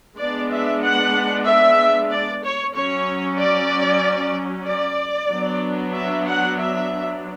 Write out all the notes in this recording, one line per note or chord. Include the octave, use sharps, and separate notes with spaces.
G#3 B3 D4 D5
E5
F#5
E5
D5
C#5
F#3 C#4 C#5
D5
D5
F#3 B3 D4
E5
F#5
E5